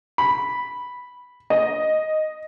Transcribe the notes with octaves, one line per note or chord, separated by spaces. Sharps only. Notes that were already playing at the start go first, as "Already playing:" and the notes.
B5
D#5